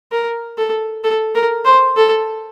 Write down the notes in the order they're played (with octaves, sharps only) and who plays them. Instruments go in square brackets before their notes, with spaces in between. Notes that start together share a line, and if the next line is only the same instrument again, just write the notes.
[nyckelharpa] A#4
A4
A4
A#4
C5
A4